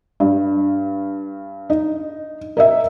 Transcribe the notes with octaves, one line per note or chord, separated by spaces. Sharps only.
G2
D#4
A#4 D#5 E5